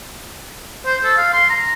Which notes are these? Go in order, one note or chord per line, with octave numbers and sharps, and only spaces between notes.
C5
A4
F5
C6
A#5